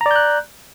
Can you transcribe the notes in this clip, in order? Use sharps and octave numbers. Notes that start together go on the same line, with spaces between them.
D5 A#5 F#6 G6